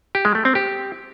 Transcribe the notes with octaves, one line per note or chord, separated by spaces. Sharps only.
G4
G#3
A3
C4
G4